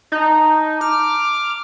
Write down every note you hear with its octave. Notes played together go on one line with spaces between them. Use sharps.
D#4 A5 A#5
D6 F6